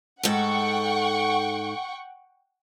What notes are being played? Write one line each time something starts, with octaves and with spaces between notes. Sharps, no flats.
G#2 A4 F#5 G5 C#6